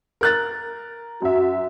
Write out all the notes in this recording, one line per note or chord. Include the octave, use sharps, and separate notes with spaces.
A#4 F#6 A6
F#2 F#4 E5